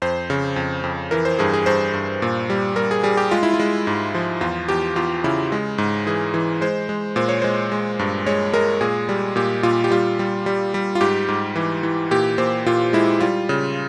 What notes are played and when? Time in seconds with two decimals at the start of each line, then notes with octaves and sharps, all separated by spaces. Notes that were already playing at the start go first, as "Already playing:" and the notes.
0.02 F2 C5
0.30 C#3
0.56 F2
0.84 F2
1.11 E3 A#4
1.25 C5
1.39 G2 G#4
1.53 G#4
1.66 G2 C5
1.94 G2
2.22 A#2
2.50 G3
2.76 G3 A#4
2.91 G#4
3.03 G3 G#4
3.17 G4
3.31 G#3 F4
3.43 E4
3.54 F4
3.59 G#3
3.87 G#2
4.15 F3
4.41 E2 F4
4.68 E2 G4
4.96 E2 F4
5.24 C#3 E4
5.52 G#3
5.78 G#2
6.07 E3 G#4
6.34 E3
6.61 G#3 C5
6.89 G#3
7.16 A#2 C5
7.28 C#5
7.42 G#3 C5
7.72 G#3
7.99 G2
8.26 G#3 C#5
8.53 G#3 A#4
8.81 A#2 G#4
9.09 G3
9.36 A#2 G4
9.63 A#2 F4
9.84 G4
9.91 G3 F4
10.19 G3
10.46 G3
10.74 G3
10.95 F4
11.01 G#2 G4
11.28 G#2
11.56 E3
11.83 E3
12.11 A#2 G4
12.38 A#2 C5
12.66 A#2 F4
12.93 G#3 E4
13.20 G3 F4
13.49 C#3